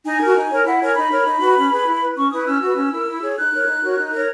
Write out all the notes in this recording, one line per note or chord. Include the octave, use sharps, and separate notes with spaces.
D#4 G#5
F#4 A#4
D#4
A#4 C#5
E4 F#5
A#4 C#5 G#5
D#4 B5
A#4 C#5
D#4
F#4 B4
C#4
G#4 B4
E4
B4
C#4 C#6
E4 B4 D#6
C#4 E6
F#4 B4
C#4
E4 A#4
E4
G#4 C#5
D#4 F#6
A#4 C#5
D#4
F#4 A#4 C#5
D#4
A#4 C#5